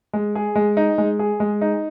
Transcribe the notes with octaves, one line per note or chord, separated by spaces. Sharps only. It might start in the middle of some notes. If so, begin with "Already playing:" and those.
G#3
G#4
G#3
D#4
G#3
G#4
G#3
D#4